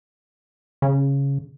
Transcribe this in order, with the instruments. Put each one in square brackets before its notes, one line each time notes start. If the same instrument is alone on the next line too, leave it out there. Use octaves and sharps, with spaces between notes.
[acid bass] C#3